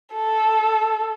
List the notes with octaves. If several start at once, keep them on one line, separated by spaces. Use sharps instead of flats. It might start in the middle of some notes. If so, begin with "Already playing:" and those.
A4